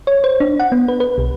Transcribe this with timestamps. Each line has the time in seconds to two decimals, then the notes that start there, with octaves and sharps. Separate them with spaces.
0.07 C#5
0.24 C5
0.40 D4
0.60 F#5
0.72 B3
0.88 B4
1.00 B4
1.18 B1